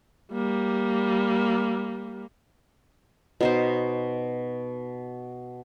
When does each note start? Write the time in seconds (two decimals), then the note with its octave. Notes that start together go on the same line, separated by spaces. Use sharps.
0.33 G3 A#3
3.41 B2 D#4 C5